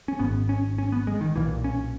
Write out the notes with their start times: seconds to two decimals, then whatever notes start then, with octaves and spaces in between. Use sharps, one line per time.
0.08 C#4
0.19 G#1 G#2 B3
0.49 C#4
0.78 C#4
0.92 B3
1.07 G#3
1.21 D#3
1.36 B1 A#2 E3
1.64 C#4